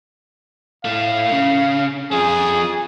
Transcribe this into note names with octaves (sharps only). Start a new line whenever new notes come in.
A2 A3 F5
C#3
F3 C4 G#4